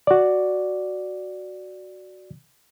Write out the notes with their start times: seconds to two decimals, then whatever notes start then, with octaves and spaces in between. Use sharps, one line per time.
0.07 F#4 D5